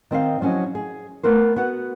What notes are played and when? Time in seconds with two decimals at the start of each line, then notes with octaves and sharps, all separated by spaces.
0.11 D#3 C4 D#5 F5
0.41 F3 F#3 C#4 E4 D#5
0.75 G#4
1.23 A3 B3 A#4 C5
1.56 B3 F#4 F#5